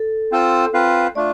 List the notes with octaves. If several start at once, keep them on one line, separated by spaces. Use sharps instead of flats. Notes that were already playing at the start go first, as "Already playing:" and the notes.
Already playing: A4
C4 F4 A4 C5
C4 F4 B4 F5
A3 D4 F4 D5